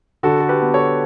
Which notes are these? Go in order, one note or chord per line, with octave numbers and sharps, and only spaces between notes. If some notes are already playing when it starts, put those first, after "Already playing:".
D3 F#4 A4
A4
G4 B4
B3
A4 C#5